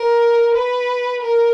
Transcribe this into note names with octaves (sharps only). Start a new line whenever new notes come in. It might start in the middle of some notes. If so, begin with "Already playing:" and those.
Already playing: A#4
B4
A#4